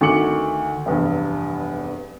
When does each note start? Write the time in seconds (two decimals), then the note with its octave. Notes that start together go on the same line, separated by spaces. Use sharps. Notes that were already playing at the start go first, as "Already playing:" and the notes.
0.01 D2 D#3 C#6 D6 C#7 F#7
0.86 F1 E2 G2